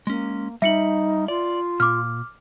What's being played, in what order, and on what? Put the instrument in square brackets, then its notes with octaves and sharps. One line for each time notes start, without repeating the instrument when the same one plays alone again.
[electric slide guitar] G#3 C#4 [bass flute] A#3
[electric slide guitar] G3 [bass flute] D#4 [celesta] E5 C#7 F#7
[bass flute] F4 [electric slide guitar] D5
[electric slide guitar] A#2 [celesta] D6 F6